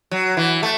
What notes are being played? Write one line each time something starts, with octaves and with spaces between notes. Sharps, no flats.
F#3
E3
A3